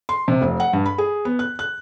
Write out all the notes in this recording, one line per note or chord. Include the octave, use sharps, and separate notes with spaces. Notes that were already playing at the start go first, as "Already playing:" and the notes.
C6
C3
F1
F#5
G2
B5
G#4
B3
F#6
F#6